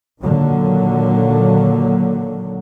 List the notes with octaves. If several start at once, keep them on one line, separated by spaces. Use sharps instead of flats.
A#2 D3 D#3 F#3 A#3